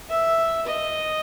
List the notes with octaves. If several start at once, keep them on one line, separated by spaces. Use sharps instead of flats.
E5
D#5